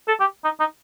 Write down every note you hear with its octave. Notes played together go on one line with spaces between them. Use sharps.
A4
G4
D#4
D#4